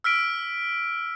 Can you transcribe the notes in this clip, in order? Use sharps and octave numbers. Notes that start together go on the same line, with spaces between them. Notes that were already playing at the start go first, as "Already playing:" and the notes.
E6 F6 B6 D7